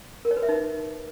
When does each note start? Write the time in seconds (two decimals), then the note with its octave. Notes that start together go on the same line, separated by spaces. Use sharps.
0.25 A#4
0.31 C#5
0.37 B4
0.43 E5
0.49 D#4